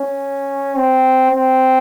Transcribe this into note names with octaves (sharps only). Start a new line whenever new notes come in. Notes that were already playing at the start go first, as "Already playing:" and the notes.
Already playing: C#4
C4
C4